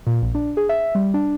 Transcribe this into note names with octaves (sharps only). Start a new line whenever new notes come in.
A#2
A#1
D4
G#4
E5
G3
D4